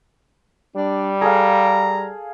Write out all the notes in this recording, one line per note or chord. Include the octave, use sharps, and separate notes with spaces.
G3 D4
G#4 A4 F5 A#5